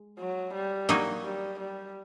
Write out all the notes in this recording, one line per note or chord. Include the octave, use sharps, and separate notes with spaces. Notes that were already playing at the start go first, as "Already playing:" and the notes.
Already playing: G#3
F#3
G3
F#3 A#3 D#4 F#4
G3
G3